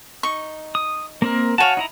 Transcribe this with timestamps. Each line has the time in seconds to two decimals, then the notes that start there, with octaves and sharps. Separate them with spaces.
0.23 D#4 C#6
0.75 D#6
1.22 A#3 C4 A#4
1.58 F#4 C#5 F5 G#5 A5
1.77 D#4 E4 A#5